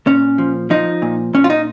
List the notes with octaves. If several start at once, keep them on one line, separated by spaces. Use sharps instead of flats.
A#2 C#4
F3
F3 D#4
A#2
A#2 C#4
F4
D#4